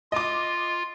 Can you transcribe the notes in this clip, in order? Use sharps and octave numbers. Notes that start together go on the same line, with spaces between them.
F4 D#5 D6